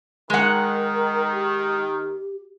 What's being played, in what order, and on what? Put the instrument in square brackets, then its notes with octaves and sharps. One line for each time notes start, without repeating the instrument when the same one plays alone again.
[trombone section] D#3 [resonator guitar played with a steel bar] G#3 F#5 [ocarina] A#4
[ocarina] G4